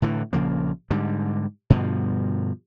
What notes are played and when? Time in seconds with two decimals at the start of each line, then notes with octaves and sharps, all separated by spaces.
0.02 A2 D3 E3
0.33 A#1 C#3 F3 A#3
0.91 G#2 D3 G3
1.70 G2 B2 D3 F3